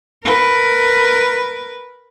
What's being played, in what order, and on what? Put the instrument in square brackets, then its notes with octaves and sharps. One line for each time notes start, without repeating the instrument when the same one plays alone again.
[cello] A#4 B4